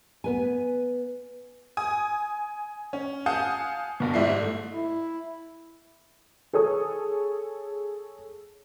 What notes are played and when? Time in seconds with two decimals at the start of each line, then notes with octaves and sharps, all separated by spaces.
0.24 B3 B4 G#5
1.77 G#5 D#6
2.93 C#4
3.26 F5 F#5 G#5 A5 D#6 G6
4.00 G2 B2
4.14 G#2 G3 E4 C7
4.40 A3
4.74 E4
6.53 G#4 A4 C#5 D#6